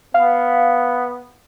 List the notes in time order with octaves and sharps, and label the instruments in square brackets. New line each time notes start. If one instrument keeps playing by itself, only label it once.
[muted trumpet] B3 [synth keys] F5